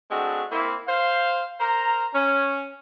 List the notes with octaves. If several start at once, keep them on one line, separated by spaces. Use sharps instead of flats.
G#3 A3 C4 D4 F#4
A#3 C4 E4
C5 F5
A#4 C5 A#5
C#4